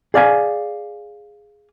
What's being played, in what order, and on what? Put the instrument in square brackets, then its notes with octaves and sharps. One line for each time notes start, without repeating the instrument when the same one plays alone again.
[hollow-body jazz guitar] G#4 D5 F5 G#5